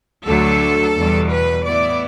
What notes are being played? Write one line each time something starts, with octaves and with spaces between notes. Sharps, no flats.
D2 D3 F#3 A3 A4
E2 B2 G3
B4
A2 E3 B3 E4 D5